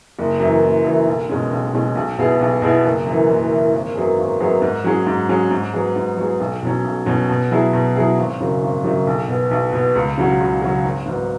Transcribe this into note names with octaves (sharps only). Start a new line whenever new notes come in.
F#1
F#2 E3
F#1
F#2 E3
B1
B2 G#3 C#4
B1
B2 G#3 C#4
B1
B2 B3 E4 G#4
B1
B2 B3 E4 G#4
F#1
F#2 E3
F#1
F#2 E3
G#1
F#2 F#3 B3 G#4
G#1
F#2 F#3 B3 G#4
G#2
F#3 C#4 G#4
G#2
F#3 C#4 G#4
G#2
F#3 B3 G#4
G#2
F#3 B3 G#4
B1
B2 F#3 C#4
B1
B2 F#3 C#4
B2
F#3 E4 G#4
B2
F#3 E4 G#4
G#1
F#2 C#3 F#3
G#1
F#2 C#3 F#3
B1
B2 B3
B1
B2 B3
C#2
C#3 F#3 C#4 F#4
C#2
C#3 F#3 C#4 F#4
G#1
G#2 F#3 B3